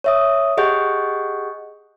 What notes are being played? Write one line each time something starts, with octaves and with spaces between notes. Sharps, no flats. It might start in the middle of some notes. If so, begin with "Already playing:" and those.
C#5 E5 D#6
G4 G#4 D#5 F#5 C#6 G6